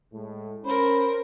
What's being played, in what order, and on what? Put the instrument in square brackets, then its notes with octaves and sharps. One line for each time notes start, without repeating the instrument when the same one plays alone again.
[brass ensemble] A2 G#3
[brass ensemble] C#4 [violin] A#4 C5 [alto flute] B5